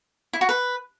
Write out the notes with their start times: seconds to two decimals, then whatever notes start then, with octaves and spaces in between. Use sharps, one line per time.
0.33 E4
0.41 F#4
0.49 B4